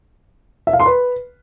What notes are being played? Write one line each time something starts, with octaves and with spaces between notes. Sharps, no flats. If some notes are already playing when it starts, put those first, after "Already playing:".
E5
F5
C6
B4